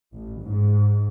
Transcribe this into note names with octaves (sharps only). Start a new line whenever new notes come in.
A1
G#2